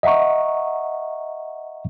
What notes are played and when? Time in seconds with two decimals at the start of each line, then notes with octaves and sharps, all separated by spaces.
0.03 D#5 E5 F#5 A#5 C#6